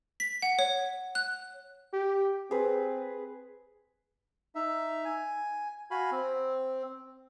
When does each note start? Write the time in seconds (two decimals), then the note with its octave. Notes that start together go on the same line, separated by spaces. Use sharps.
0.20 B6
0.42 F#5
0.59 C#5
1.15 F#6
1.93 G4
2.51 C4 G#4 B4
4.55 D#4 E5
5.05 G#5
5.91 F#4 F5 G#5 B5
6.11 C4